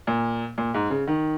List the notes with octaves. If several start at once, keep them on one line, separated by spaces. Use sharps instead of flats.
A#2
A#2
G#2
C#3
D#3